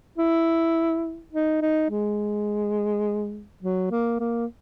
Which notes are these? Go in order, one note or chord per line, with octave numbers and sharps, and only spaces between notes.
E4
D#4
D#4
G#3
F#3
A#3
A#3